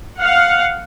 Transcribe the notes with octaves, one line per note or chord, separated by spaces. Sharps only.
F5 F#5